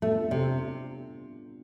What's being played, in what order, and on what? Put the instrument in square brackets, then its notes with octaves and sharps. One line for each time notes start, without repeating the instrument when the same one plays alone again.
[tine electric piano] A2 G3 B3 D4 F4 [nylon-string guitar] A3
[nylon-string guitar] C3